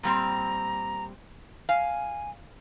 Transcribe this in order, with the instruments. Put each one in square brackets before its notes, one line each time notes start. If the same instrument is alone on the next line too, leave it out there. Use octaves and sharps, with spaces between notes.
[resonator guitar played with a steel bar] A#2 G3 C4 [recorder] A#5
[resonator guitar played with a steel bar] F5 [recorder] G#5